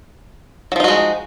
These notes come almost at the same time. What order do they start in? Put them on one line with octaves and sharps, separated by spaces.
F#3 F3 D#4 F#4 G#3